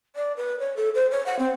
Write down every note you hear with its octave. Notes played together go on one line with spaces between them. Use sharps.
D5
B4
C#5
A4
C5
C#5
F#5
C4